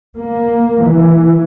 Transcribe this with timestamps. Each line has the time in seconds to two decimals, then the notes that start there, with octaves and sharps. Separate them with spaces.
0.17 A#3
0.84 E3